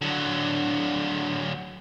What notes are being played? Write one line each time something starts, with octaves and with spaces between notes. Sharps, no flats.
D3 F#3